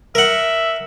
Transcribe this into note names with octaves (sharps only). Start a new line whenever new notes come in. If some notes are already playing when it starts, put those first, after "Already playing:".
A#4 E5 F#5